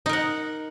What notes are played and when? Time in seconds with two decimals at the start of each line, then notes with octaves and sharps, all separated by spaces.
0.06 D#4
0.09 A#4
0.13 F#5